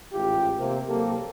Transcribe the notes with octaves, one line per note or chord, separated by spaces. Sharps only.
A1 G#2 F4 G4
C3 A#3
C2 C3 F#3 A#3 G4 A4